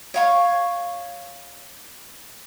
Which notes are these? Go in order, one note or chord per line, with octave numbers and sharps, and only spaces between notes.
C#5 F5 C#6